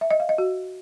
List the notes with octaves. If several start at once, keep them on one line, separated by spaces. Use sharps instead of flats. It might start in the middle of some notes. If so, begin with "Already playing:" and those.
E5
D#5
F5
D#5
F#4